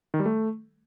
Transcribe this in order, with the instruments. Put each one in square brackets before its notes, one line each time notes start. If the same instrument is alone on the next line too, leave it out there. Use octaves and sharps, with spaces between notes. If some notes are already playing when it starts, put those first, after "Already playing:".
[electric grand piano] D#3
G3
A3